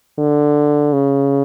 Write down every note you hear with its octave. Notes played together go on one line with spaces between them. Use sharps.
D3
C#3